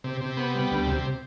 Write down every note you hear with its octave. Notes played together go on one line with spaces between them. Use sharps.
C3
C3
B3
G3
D2
C3